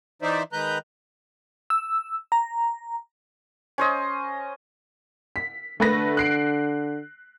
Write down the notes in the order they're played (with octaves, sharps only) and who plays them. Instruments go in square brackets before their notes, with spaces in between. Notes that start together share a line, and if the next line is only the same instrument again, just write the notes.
[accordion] E3 D#4 C5 D5 E5
D#3 G#3 B4 A#5 F#6 G6
[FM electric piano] E6
A#5
[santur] C#4 C5 D#5
[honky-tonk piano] B6
[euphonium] D3 [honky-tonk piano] A3 B4 A#6
[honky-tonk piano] F#6 C7 D7